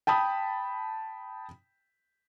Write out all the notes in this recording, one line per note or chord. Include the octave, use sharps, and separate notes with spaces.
G5 A5 B5 D#6